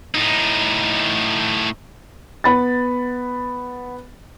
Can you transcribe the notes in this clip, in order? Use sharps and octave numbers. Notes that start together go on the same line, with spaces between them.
A2 D#4
B3 B5 A6